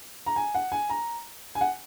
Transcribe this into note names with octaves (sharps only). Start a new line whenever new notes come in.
A#5
G#5
F#5
G#5
A#5
G#5
F#5